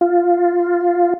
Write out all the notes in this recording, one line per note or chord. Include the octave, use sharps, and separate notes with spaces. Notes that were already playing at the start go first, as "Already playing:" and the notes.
F4